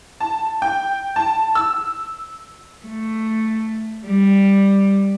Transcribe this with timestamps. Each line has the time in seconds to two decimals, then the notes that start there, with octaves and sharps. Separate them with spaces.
0.20 A5
0.62 G5
1.16 A5
1.55 E6
2.86 A3
4.07 G3